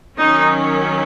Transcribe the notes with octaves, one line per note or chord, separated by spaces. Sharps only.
D#3 F#3 C#4 D#4